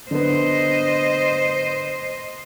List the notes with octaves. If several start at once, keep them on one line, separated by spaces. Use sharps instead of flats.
D3 B3 C5 D#5